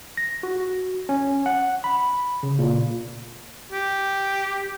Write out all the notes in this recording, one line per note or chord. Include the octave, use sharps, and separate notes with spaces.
A#6
F#4
C#4
F#5
B5
C#3
A#2
G4